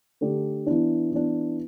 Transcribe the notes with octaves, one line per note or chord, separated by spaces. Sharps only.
D3 A3 D4 G4
E3 B3 D4
E3 B3 D4